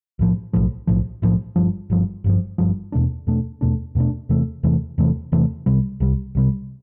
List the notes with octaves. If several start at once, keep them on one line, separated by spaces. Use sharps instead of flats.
B1 A2 F3
B1 A2 F3
B1 A2 F3
B1 A2 F3
G1 G2 F3
G1 G2 F3
G1 G2 F3
G1 G2 F3
E2 B2 A3 D4
E2 B2 A3 D4
E2 B2 A3 D4
E2 B2 A3 D4
E2 C3 E3 A3
E2 C3 E3 A3
E2 C3 E3 A3
E2 C3 E3 A3
C2 C3 G3
C2 C3 G3
C2 C3 G3